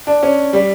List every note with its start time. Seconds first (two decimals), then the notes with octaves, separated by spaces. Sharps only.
0.07 D4
0.23 C#4
0.53 G3